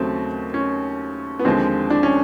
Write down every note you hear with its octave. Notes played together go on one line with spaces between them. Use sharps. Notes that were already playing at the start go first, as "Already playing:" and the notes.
Already playing: D#2 C#3 F#3 A3 C4
C#4
B3
D#2 D3 F3 G#3 C4
D4
C#4